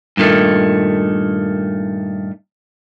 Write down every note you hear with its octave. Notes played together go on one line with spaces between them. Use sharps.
G2 A#2 D#3 A3